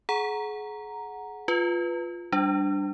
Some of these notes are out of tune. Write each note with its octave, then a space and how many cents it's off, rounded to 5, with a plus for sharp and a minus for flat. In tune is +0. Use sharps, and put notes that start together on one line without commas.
G#4 +30 F#5 +0 A#5 +0
F4 +0 B4 +0
G3 +0 D4 +0